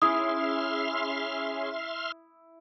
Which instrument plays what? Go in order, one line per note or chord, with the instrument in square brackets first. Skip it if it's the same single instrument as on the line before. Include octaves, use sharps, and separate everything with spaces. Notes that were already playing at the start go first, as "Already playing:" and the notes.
[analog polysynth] C#4 G#4 [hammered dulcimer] E4 [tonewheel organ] E5 C6 F6 [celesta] D#6